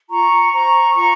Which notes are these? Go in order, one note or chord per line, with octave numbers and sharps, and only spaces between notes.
F4 A#5 C#6
C5 A#5 C#6
F4 A#5 C#6